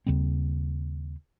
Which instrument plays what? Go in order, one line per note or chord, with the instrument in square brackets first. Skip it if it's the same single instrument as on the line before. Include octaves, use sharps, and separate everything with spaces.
[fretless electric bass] D#2 C#3 G3 C4